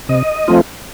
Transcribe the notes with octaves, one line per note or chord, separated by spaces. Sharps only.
C3 D#5
F3 A3 C4 F4